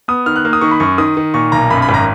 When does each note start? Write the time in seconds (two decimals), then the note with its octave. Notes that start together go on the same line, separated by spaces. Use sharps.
0.08 B3 D#6
0.26 D#3 F6
0.36 F#6
0.45 A#3 F6
0.53 D#6
0.61 D#3 C#6
0.71 B5
0.80 F#2 C#6
0.98 D#3 D#6
1.17 D#3
1.34 A#2 C#6
1.52 B1 A#5
1.70 F#2 B5
1.82 B5
1.89 G#1
1.94 A#5